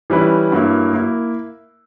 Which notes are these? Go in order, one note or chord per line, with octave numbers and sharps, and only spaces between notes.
E3 G3 C#4 E4 B4
G2 F#3 A#3 E4
A#3 E4